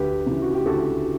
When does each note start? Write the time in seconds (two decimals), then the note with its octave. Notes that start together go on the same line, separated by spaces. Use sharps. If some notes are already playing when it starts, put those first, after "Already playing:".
Already playing: D2 G4 B4
0.26 C#3 E3
0.42 F#4
0.54 G4
0.66 D2 F#4 A4